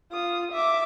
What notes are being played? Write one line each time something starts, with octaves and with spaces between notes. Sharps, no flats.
F4 D#6
E5 D6